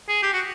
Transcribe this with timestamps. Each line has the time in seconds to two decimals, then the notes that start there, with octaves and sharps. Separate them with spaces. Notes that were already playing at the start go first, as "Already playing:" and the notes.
0.09 G#4
0.23 G4
0.33 F#4